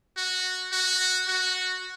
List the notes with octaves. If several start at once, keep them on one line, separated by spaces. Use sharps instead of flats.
F#4
F#4
F#4